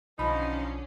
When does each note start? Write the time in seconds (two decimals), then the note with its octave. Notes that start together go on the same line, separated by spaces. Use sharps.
0.19 B1 D3 F3 C#4 D#4 D#5 B5